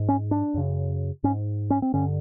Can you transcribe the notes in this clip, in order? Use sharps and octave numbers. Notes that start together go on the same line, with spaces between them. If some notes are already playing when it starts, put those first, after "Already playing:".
Already playing: G#2
C#4
D4
F#2 C#3
G#2 C#4
C#4
C4
G2 D3 C#4